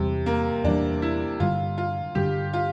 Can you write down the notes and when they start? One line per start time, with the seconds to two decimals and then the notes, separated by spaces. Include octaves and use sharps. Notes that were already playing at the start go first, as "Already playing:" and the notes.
Already playing: E2 C3 E3 G3
0.26 A#3
0.64 E2 E3 G3 D4
1.02 E4
1.40 G2 D3 G3 F4
1.78 F4
2.15 G2 D3 G3 G4
2.53 F4